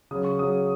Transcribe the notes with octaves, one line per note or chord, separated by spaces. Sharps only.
C#3 F#3 C#4 D#6
C#6
C#3 F#3 C#4 D#6